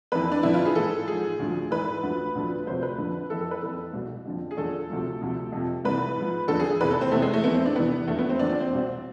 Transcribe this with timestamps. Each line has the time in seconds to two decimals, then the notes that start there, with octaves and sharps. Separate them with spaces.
0.12 F2 E3 B4
0.32 D4
0.43 F2 D3 F3 E4
0.54 F4
0.65 G#4
0.75 G#2 E3 A4
1.08 G#2 F3 G#4
1.39 D2 D3 F3
1.71 G#2 E3 B4
2.03 D2 D3 F3
2.35 D2 D3 F3
2.66 D2 C3 F3 C5
2.83 B4
2.98 F2 D3 F3
3.30 F2 E3 A4
3.41 A4
3.51 B4
3.62 F2 E3 A4
3.93 C2 B2
4.26 F2 D3 F3
4.51 G#4
4.57 E2 D3 F3 A4
4.90 D2 C3 F3
5.21 D2 C3 F3
5.52 F2 C3 F3
5.85 C2 C3 E3 B4
6.16 G#2 F3
6.48 E2 D3 F3 A4
6.60 G#4
6.70 G#4
6.81 E2 C3 E3 B4
6.91 A4
7.01 C4
7.11 E2 C3 E3 A3
7.22 G#3
7.34 A3
7.44 F2 E3 B3
7.54 C4
7.66 D4
7.76 E2 C3 E3 B3
8.07 E2 D3 F3 A3
8.19 B3
8.29 C4
8.39 E2 D3 F3 D4
8.50 D4
8.60 C4
8.71 C2 B2 C4